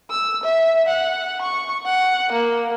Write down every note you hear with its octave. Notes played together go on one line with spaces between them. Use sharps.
E6
E5
F#5
C#6
F#5
A#3